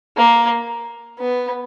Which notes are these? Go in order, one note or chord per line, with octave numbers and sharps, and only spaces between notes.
A#3
B3